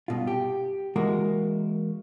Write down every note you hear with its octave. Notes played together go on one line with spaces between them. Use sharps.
G2 B2 F4
G4
E3 G#3 A#3 F#4 A#4